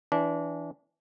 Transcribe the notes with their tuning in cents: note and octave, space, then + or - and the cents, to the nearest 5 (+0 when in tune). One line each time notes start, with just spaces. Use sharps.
E3 +0 D4 -25